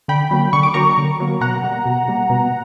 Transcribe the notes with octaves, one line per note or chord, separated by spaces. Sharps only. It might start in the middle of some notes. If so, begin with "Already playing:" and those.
D3 G5 B5
F#3 A#3
D3 C#6
D6
F#3 A#3 A#5 C#6
D3
F#3 A#3
B2 F#5 A#5
G3 A#3
B2
G3 A#3
B2